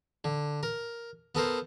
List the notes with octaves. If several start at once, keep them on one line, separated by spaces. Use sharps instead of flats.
D3
A#4
B3 A4 A#4 C5